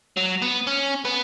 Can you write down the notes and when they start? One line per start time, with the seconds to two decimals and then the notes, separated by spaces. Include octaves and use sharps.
0.17 F#3
0.42 B3
0.67 C#4
1.05 B3